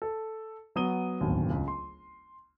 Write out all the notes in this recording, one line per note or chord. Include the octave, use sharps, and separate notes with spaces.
A4
F#3 B3 D#6 D#7 G7
D1 G1 D#2
C#2
C6